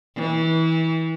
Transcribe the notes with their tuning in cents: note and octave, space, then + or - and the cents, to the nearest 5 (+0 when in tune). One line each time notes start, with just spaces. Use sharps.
E3 -25